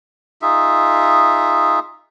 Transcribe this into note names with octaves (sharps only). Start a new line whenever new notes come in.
D#4 F4 G#4 E5